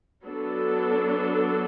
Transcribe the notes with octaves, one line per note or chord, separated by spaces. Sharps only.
F#3 B3 D4 A4